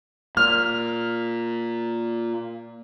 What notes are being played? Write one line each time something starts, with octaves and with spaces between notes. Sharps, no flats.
A#2 F6